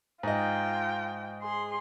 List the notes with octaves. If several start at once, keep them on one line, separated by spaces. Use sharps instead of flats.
G#2 F4 D#5 G5
G#4 C6